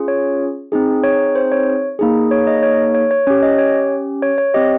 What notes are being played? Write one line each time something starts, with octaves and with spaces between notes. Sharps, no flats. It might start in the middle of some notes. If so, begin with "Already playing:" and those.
Already playing: C#4 F4 G#4
C#5
C4 D#4 G#4
C#5
C5
C#5
A#3 D#4 G#4
C#5
D#5
C#5
C#5
C#5
C#4 G4 C#5
D#5
C#5
C#5
C#5
C4 G4 D#5